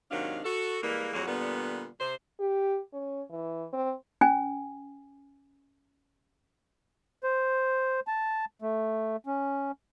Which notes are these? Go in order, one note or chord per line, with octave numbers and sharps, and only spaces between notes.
G#2 C3 D#3 F#3 D4 F5
F#4 A4
E3 G3 G#3 A#3
F2 A2 F#3 A#3 F#4 G#4
A#2 D3 G3 B3
C3 C5
G4
C#4
E3
C4
C#4 G#5
C5
A5
A3
C#4